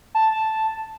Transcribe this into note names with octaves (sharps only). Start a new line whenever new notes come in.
A5